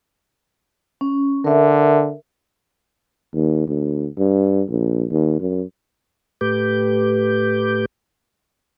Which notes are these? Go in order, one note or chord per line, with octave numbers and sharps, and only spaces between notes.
C#4
D3 A#4 E5
D#2
D2
G2
A#1
D#2
F#2
A2 A3 G4 B4 D6 G6